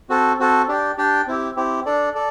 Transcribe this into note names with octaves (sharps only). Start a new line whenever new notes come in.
C4 F#4 A4
C4 F#4 A4
D4 G4 D5 G5
D4 G4 D5 G5
C4 E4 G4
C4 E4 G4
D4 A4 D5
A4 D5